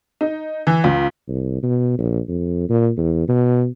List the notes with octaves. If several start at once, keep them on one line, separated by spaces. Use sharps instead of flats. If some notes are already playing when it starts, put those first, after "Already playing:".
D#4
E3
C#2
C2
B2
A#1
F2
A#2
E2
B2